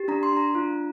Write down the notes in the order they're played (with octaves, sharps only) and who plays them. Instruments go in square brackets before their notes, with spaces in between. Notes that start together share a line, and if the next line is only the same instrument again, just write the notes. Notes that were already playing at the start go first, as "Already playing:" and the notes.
Already playing: [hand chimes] G4
D4 A#5
C6
D4 A#5
F4